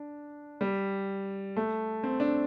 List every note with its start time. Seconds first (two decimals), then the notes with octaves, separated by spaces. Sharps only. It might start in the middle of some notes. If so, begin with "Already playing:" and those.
Already playing: D4
0.61 G3
1.57 A3
2.04 C4
2.20 D4